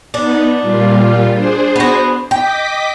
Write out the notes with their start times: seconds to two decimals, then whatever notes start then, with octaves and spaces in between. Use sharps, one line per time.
0.14 B3 D4 D#4
0.61 A#2 G3 F4
1.32 D4 G#4 C5
1.76 B3 F#4
2.31 D#5 G5 D6 B6